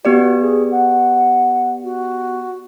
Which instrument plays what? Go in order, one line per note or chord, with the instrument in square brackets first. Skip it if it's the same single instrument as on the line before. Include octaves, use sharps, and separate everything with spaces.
[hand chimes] B3 G4 D5 [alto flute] F#4
[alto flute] G#4
F#5
F#4